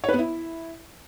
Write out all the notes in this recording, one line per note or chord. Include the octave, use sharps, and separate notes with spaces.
C#5
B4
B3
E4